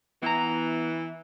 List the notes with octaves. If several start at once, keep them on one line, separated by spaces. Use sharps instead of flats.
E3 B3 A#5